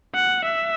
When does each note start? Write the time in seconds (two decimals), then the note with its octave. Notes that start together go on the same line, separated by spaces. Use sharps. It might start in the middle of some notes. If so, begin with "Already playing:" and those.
0.15 F#5
0.45 E5